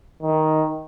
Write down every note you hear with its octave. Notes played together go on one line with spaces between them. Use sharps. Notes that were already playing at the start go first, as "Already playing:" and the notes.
D#3